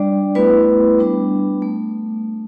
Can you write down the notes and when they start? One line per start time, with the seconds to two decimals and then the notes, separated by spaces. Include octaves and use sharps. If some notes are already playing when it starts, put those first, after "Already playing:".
Already playing: G3 D4 D5
0.35 A3 B3 E4 B4
0.99 G3 B3 D4
1.62 A3